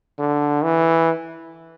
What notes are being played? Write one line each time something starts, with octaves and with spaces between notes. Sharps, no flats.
D3
E3